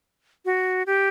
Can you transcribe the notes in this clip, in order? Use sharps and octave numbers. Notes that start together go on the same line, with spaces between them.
F#4
G4